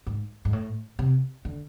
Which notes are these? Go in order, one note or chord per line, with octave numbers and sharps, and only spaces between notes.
G#2
G#2
A2
C3
D3